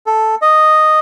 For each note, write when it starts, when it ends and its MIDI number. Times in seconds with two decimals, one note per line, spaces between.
0.06 0.35 69
0.42 1.00 75